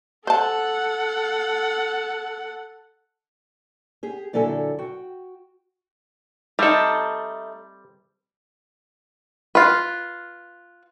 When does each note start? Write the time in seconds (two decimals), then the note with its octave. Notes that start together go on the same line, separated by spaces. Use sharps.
0.27 A4 C5 F#5 A5
4.03 G4 G#4
4.33 A#2 D3 F#3 E4 A4 G#5
4.79 F#4 G5
6.59 G3 A3 C4 D#4 A4
9.55 F4 B4